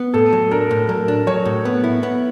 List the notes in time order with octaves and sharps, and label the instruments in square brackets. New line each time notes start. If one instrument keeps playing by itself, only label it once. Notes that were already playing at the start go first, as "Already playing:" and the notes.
Already playing: [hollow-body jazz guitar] B3
[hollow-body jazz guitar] A2 [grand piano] A4
[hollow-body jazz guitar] F#3
[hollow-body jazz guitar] D4 [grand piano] A#4
[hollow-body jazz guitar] A2
[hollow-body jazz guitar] F#3 [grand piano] A#4
[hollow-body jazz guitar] D4
[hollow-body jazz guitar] F#3 [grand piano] C#5
[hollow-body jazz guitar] A2
B3
E4
B3